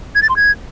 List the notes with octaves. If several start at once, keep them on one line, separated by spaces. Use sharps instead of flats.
G#6
A6
C6
G#6